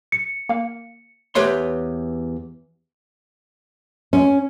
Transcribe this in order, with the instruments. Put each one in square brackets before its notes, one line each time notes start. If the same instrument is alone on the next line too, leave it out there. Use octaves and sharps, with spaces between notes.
[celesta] C#7
[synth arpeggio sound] A#3 F5
[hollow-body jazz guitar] E2 G4 B4 C#5 C6
[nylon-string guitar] C#4